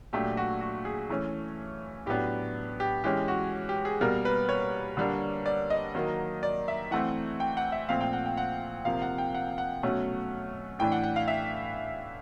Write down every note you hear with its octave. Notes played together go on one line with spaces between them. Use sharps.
A#2 F#3 A3 D4 G4
F#4
F#4
G#4
E3 A3 C#4
A2 F#3 B3 D4 G4
G4
E3 G#3 C#4 G4
F#4
G4
G#4
B2 G3 A#3 A#4
B4
C#5
D3 G3 A#3 D4
D5
D#5
D#3 F#3 A#3
D5
E5
E3 A3 C4 F#5
G5
F#5
E5
A#2 F3 A3 C4 F5
G5
F#5
G5
F#5
C3 F3 A#3 F5
F#5
G5
F#5
F#5
B2 F#3 A3 C#4
A2 E3 A3 D4 G5
F#5
F#5
F5
E5